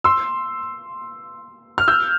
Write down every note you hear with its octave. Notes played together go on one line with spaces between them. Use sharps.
C6 E6
F6
E6 G6